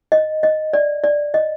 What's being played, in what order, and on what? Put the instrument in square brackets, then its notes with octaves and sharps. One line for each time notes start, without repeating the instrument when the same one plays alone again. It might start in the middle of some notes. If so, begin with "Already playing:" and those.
[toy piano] D#5
D#5
D5
D5
D#5